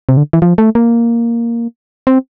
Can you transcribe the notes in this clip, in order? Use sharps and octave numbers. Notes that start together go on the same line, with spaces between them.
C3
D3
E3
F3
A3
A#3
C4